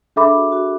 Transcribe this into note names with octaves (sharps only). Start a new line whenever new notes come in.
D4 G#4 A4 E5 B5 D6
F#4
F#4